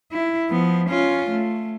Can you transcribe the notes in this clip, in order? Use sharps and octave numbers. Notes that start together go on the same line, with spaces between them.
E4
F3 B3
C#4 F4
A3